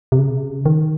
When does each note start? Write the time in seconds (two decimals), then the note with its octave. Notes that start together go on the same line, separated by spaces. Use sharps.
0.12 C3
0.19 C#3
0.66 D#3